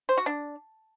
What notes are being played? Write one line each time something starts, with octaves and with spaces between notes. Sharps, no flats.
C5
F#4
D4